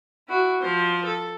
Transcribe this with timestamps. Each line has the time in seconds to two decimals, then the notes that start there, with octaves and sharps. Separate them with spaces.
0.28 E4 F#4
0.62 F3 C5
1.05 A4